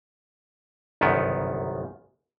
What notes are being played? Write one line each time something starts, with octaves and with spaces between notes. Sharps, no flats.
G1 C2 F#2 D#3 B3